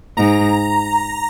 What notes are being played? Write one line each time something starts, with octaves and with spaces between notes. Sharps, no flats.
G#2 A#5